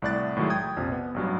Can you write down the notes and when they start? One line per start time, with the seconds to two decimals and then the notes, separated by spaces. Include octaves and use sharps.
0.02 C2 A2 D5 F#6 A6
0.37 A2 D#3 F#3 G#3
0.50 G5 D#6 G#6
0.77 A#1 F2 C3
0.92 B3
1.14 A1 G2 F#3